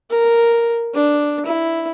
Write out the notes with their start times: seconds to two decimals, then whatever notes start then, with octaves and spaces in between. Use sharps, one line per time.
0.10 A#4
0.94 D4
1.46 E4